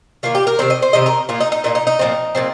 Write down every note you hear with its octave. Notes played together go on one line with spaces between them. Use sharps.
D#3 A#3 F4
G4
A#4
C3 D#3 C4 C5
D#5
C5
C3 D#3 C4 D#5
A#4
A#2 A#3 F4
D#4
D#4
A#2 A#3 D#4
D#4
D#4
A#2 F3 C4
A#2 F3 C4